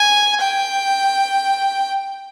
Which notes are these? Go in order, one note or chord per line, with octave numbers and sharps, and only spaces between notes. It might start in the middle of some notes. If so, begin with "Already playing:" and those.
Already playing: G#5
G5